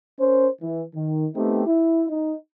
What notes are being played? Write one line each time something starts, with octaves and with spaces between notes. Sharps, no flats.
C#4 A#4 C5
E3
D#3
A3 B3 C4 D#4 G4
E4
D#4